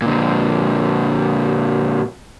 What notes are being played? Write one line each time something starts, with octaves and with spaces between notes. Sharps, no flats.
A#2 D3